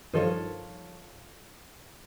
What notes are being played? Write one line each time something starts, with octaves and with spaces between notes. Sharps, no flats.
G2 D#3 F3 F4 A4 C#5